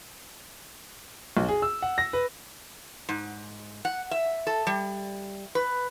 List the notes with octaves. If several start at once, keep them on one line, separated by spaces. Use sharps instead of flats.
B1
G#4
E6
F#5
A#6
B4
G#2
F#5
E5
A4
G3
B4